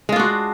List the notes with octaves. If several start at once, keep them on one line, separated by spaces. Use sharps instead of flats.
G#3 D4 F4 F#4